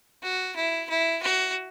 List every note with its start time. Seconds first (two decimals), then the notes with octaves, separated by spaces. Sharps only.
0.23 F#4
0.56 E4
0.90 E4
1.23 F#4